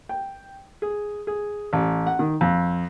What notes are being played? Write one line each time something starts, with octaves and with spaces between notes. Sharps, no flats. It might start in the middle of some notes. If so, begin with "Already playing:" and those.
G5
G#4
G#4
A1
F#5
D#3
F2